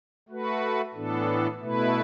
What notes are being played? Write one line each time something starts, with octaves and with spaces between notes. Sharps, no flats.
A3 F#4 B4
A2 E3 B3 D4 A4
B2 A3 E4 B4